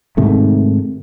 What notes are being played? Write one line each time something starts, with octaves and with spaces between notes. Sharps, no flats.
G#2 C3 D#3 A3